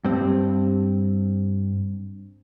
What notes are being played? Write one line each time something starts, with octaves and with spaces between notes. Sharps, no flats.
G2 C4